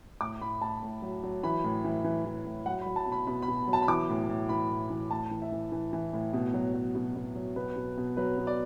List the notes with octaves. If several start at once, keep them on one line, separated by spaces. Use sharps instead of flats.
A2 D6
A2 B5
A2 A5
A2
F#3
F#3
E3 B5
A2
E3
E3
E3
A2
F#3 F#5
B5
F#3
A5
B2
B5
B2 B5
B5
B2
F#3
A5
B5
E3 D6
A2
A2
E3 B5
A2
E3
A2 A5
E3
E5
E3
E3
E3
A2
B2
F#3
F#3
B2
B2
F#3
B2 B4
B2
B2
F#3 B4
B2
D5